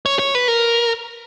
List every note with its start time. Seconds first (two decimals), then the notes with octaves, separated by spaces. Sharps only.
0.06 C#5
0.19 C#5
0.35 B4
0.48 A#4